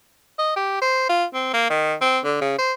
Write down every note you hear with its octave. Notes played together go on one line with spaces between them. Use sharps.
D#5
G4
C5
F4
C4
A#3
D#3
C4
D3
C#3
C5